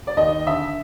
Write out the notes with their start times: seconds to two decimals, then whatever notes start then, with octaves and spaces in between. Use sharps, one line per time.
0.07 D5
0.17 D#2 D#5
0.47 D3 E5